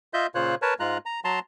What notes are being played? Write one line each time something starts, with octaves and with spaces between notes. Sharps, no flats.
F4 D#5 E5 G6
A#2 C#3 F4 C5 C#5 F#6
A#4 B4 C#5 A5
G#2 G#3 F4 A#5 F#6
A#5
F#3 A5 A#5 C6